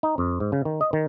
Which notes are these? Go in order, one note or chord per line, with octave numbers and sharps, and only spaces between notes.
D#4
F2
G#2
C#3
D#3
D#5
D#3